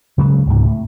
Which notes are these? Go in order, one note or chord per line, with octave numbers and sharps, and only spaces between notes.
C#3 F#3 G#3
C#2 G#2 C3
A2